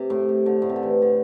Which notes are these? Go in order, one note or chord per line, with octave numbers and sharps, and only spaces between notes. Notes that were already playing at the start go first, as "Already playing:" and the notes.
Already playing: C3
A2
C3
D3
A2
C3
D3
E3
D3